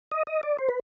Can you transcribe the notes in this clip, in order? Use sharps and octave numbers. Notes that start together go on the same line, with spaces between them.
D#5
D#5
D5
C5
B4